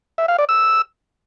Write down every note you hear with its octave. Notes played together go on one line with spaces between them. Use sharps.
E5
F5
D5
E6